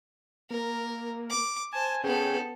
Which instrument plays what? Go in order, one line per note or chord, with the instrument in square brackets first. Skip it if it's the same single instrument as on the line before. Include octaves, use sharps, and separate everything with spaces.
[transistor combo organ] A#3 [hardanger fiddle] A#4
[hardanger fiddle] D6
[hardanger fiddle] C5 A5 [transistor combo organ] G#5
[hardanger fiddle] B3 A4 [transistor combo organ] C#4 G#4 G5